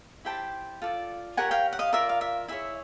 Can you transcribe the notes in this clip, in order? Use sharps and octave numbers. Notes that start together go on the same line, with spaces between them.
E4 G4 C5 G5 A5
F4 A4 D5
G4 A#4 C#5 F#5 G#5
F5 G5
F#5
D#5 F5
F4 A#4 D5 E5
F5
E5
E4 G#4 C#5 E5